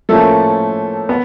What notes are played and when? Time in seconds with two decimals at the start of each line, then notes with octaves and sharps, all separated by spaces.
0.09 A2 F3 A3 A#3 C#4 A4
1.09 B3